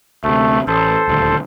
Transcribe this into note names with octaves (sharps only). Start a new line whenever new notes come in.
D2 C3 A3
A1 A4 C5
D#1 D2